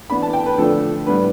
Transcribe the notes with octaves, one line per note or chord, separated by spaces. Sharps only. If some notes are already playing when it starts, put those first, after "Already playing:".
E3 B3 D4 B5
A5
G5
B4
D3 F3 A3 D4 A4
A2 G3 B3 D4 B4